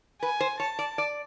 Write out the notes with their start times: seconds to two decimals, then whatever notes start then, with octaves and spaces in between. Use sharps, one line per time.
0.22 B4 G#5
0.40 C5
0.60 C#5 A5
0.79 D5
0.98 D5